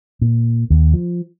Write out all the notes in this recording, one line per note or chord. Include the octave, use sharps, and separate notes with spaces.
A#2
D#2
F3